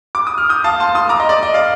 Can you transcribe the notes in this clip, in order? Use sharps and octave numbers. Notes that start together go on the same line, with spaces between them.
D6
D#6
F6
D#6 G6
F5 A5
A5 C6
C6 D#6
A#5 D6
D#5
D5
D#5
D5 F5